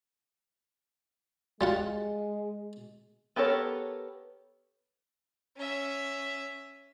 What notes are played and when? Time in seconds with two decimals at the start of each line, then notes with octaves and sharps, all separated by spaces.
1.61 G3 G#3 F4 F#5
3.36 B3 G4 A4 A#4 C#5
5.56 C#4 E5